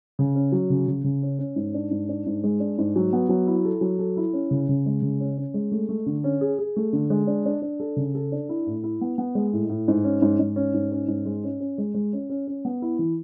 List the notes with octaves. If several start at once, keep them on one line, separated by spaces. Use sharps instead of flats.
C#3
C#4
F#3
C#3
C#3
C#3
C#4
C#4
G#2
D4
G#2
D4
G#2
G#3
D4
G#2
F#3
B3
F#3
E4
A4
F#3
A4
E4
C#4
C#3
C#3
G#3
C#3
C#4
C#4
G#3
A3
A3
D3
C#4
G#4
G#4
A3
D3
G#3
D4
D4
D4
A4
C#3
A4
D4
E4
A2
E4
B3
B3
G#3
A2
A2
G#2
C#4
G#2
G#2
C#4
G#2
C#4
G#2
G#3
C#4
C#4
G#3
G#3
C#4
C#4
C#4
B3
E4
E3